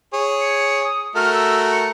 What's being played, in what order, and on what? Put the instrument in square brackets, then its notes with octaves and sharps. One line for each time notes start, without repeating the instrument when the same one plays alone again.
[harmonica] G#4 C#5
[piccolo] C#7
D#6
[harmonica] A3 F#4 A#4 [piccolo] F6
[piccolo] E6
C#7